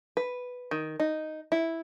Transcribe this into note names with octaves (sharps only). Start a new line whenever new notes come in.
B4
D#3
D#4
E4